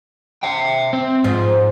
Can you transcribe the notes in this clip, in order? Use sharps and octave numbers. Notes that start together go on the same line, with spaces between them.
E5 G5
C4
G#2 F3